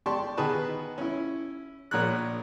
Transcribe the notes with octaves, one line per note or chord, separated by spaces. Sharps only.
G4 D5 A5 C6 C#6
B2 D#3 G#4 B4 A5
C#4 E4
A#1 A#2 A#4 C#5 D5 F#6